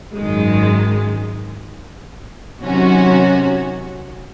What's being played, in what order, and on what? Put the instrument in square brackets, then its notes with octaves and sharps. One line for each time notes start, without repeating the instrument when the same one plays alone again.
[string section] G#1 F#2 D#3 G#3
C3 D#3 F#3 C#4 F#4